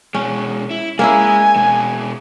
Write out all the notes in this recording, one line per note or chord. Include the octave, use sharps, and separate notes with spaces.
B2 G#3 C#4
E4
G#3 A#3 C#4 E4 G#5
B2 G#3